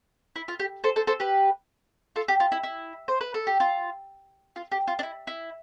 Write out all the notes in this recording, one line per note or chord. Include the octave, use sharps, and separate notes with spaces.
E4
F4
G4
A4 C5
A4 C5
A4 C5
G4 B4
F4 A4
G4
F4
E4
E4
C5
B4
A4
G4
F4
F4
G4
F4
D4
E4
E4